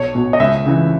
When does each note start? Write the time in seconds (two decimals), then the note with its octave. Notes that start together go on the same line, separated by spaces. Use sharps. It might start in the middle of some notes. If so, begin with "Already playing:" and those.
Already playing: B1 C#5
0.15 B2
0.33 D#5
0.40 C#2 E5
0.66 C#3 E3